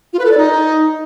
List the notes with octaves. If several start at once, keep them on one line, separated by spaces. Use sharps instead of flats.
F4
B4
A4
D5
D#4